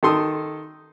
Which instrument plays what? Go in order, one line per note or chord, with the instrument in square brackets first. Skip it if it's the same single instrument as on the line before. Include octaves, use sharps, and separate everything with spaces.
[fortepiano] D#3 A4 C6 D#6